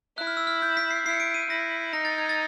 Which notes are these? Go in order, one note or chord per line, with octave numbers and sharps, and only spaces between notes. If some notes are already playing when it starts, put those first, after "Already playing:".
E4 F#6
F6
E6
F6
G6
B6
C7
E4 C7
C#7
D7
D#7
E4 A#6
D#4 A#6
A6
G#6
A6